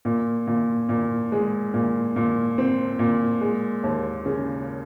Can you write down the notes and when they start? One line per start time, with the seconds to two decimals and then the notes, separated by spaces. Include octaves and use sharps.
0.05 A#2
0.47 A#2
0.89 A#2
1.32 G#3
1.74 A#2
2.16 A#2
2.58 C4
2.99 A#2
3.41 G#3
3.84 D#2
4.26 C#3